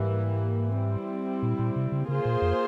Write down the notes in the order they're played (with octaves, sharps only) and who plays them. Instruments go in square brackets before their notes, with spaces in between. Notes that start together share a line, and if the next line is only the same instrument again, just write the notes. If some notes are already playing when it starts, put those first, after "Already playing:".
Already playing: [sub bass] G#2 [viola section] E3 G3 A#3 E4
[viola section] G3 C4 E4
[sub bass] A#2
A#2
C3
C#3
[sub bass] C#3 [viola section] A#3 F4 G#4 C5
[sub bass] A#2
F2